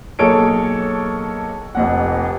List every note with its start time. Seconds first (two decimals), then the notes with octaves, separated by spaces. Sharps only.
0.19 B1 A#3 G#4 A4 C#5 D7
1.75 F1 F2 F#5